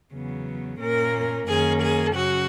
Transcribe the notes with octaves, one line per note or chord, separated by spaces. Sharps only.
E2 C#3 F#3 B3
A#2 A#3 C#4 A#4
F#2 D#3 A#3 C#4 G#4
G#4
C#3 F#3 C#4 F#4